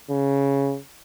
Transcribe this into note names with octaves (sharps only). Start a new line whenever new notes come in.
C#3